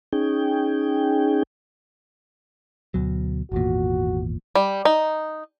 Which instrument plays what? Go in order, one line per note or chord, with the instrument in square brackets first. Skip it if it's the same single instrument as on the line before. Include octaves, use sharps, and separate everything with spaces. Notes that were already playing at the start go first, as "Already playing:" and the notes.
[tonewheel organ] C#4 D#4 G#4 G5
[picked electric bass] D2 B2 F#3
[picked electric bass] G#1 E2 A#2 [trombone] F#4
[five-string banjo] G3
D#4